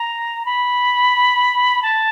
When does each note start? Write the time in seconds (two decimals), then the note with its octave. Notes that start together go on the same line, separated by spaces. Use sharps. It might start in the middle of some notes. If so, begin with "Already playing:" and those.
Already playing: A#5
0.46 B5
1.83 A5